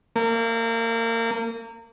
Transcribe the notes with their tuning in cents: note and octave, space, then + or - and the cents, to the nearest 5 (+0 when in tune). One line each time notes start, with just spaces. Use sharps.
A#3 -30